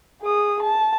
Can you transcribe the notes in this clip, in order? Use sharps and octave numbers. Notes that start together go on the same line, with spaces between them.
G#4 D#6
A5